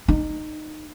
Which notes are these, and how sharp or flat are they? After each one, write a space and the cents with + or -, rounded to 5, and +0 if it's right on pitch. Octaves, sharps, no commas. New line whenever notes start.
D#4 -20